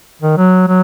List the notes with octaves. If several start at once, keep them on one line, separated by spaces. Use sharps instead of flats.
D#3
F#3
F#3